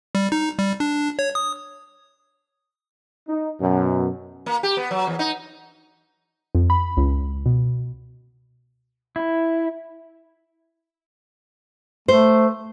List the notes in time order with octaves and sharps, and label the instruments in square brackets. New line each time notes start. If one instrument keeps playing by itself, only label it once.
[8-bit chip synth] G3
D#4
G3
D4
C#5
D#6
[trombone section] D#4
F#2 B2
[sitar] A#3
G4
B3
F#3
E2
D#4
[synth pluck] F2
B5
C#2
B2
[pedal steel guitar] E4
[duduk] A3 [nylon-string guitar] C5